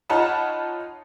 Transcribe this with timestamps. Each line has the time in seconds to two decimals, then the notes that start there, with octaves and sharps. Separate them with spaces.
0.10 D#4 F4 C#5 F#5 A5 B5